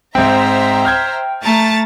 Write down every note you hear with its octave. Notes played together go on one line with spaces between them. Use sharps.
G#2 C4 C5 E5 G5 A#5
F6 G6 G#6
A3 A5 A#5 A6